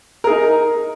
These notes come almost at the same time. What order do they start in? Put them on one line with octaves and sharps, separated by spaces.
A#4 G#4 D#4